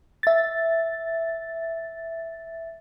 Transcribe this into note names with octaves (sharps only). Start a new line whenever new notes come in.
E5 A6